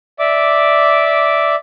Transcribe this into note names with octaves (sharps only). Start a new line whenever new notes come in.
D5 E5 D6